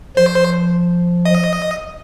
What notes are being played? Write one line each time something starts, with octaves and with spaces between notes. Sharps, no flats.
F3 C5
D#5